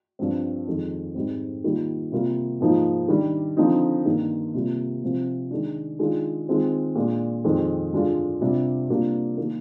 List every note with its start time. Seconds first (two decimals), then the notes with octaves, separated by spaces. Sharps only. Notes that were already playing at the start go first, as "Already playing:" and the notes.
0.19 G2 F3 C4
0.68 F2 D#3 G#3
1.15 G#2 G3 C4
1.64 D#3 G3 A#3 F4
2.12 C3 G3 A#3 F4
2.61 G#2 F3 A#3 D#4
3.08 D#3 G3 D4
3.57 D3 F3 C4 D#4
4.06 G2 D#3 A#3
4.54 C3 G3 A#3 F4
5.03 C3 F3 C4
5.51 D#3 G#3 D4
5.99 D#3 G#3 D4 F4
6.48 D#3 G#3 C4 F4
6.95 A#2 G#3 D4
7.44 F2 D#3 G#3 C4
7.93 G2 D3 G#3 D4 F4
8.41 C3 G3 D4 F4
8.90 C3 G3 A#3 D4 F4
9.38 D#3 A#3